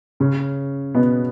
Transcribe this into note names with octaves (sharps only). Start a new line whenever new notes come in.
C#3 C#4
B2 B3